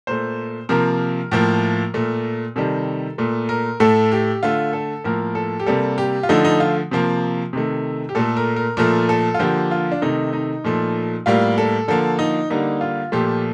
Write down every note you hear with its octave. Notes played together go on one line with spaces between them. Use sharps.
A#2 A3 C5
C3 F3 A#3 A#4
A2 F3 A#3
A#2 A3
C3 D#3 G3 A4
A#2 A3
A#4
A2 A3 A4
G4
D3 A3 F4
A4
A2 F3 A#3 A#4
A4
G4
C3 G3 A#3 A4
G4
F4
D3 F3 A3 D#4
D#4
F4
C3 F3 A#3
C3 D#3 A3
G4
A#2 A3 A4
A#4
A#4
A#2 F3 A3 A#4
A4
F4
D3 F3 A#3 G4
F4
D4
C3 D#3 A3 D#4
D#4
A#2 F3 A3
A2 G3 A#3 F4
A4
D3 F3 A#3 A4
D#4
D3 G3 A#3 D#4
F4
A#2 F3 A3 G4